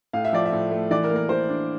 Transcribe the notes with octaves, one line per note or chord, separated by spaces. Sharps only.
A2 F5
E5
F3 D5
E5
A2
A3
E3 D5
A#4
A#3
A#4
E3 C5
D4